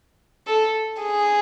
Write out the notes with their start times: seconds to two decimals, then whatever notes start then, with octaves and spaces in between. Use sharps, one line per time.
0.47 A4
1.01 G#4